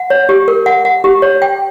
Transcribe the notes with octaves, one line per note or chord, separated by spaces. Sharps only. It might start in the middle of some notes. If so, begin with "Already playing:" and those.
Already playing: F#5
C#5
G4
A#4
F#5
F#5
G4
C#5
G5